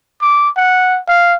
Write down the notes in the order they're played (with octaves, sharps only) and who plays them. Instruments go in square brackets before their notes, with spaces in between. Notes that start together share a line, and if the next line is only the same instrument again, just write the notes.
[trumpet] D6
F#5
F5